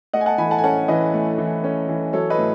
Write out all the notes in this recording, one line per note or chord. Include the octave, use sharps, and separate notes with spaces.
A3 D#5 F#5
G#5
F#5 A5
E3 G#5 B5
F#5 A5
G#5
C#4 F#5 A5
E3 B4 D#5
A3
E3
C#4
E3
F#3 A4 C#5
B4 D#5
A2